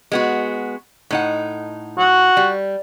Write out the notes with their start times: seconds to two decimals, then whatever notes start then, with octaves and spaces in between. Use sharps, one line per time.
0.12 G#3 B3 F#4
1.11 A2 D#4 F#5
1.98 F#4
2.37 G3